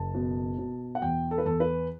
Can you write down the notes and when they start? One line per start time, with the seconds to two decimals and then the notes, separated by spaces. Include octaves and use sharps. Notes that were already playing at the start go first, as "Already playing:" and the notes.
Already playing: F#1 A5
0.15 B2
0.58 B2
0.95 F#5
1.02 E2 G5
1.31 A4
1.38 B4
1.45 E2 A4
1.60 B4